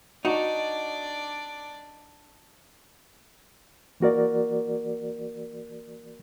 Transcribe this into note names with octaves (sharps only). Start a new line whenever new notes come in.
D4 D#4 F#4 D5
E3 A#3 F#4 A#4 D5